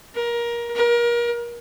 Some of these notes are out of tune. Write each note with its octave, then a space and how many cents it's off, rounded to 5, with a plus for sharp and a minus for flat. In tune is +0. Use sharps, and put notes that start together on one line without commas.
A#4 +20
A#4 +30